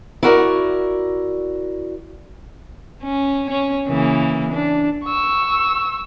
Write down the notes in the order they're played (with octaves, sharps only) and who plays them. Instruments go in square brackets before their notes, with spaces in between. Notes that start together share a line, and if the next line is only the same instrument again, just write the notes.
[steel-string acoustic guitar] E4 F#4 A#4 D5
[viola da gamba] C#4
C#4 C#5
C#3 E3 A#3
D4
[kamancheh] C#6 E6